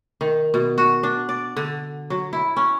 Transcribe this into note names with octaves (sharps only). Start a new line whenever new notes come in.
D#3
B2
F#4
D4
D5
D3
F#3
E4
C#4